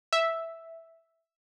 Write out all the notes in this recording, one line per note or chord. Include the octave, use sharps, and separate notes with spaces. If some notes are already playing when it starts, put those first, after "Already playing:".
E5